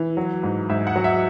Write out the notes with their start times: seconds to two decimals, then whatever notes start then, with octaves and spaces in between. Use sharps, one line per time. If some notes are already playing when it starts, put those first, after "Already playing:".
Already playing: E3
0.17 F#3
0.43 G#2
0.69 G#2 E5
0.87 F#5
0.96 F#3
1.04 E5